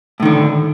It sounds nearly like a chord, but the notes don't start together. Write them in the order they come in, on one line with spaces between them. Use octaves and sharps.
A2 D#3 D3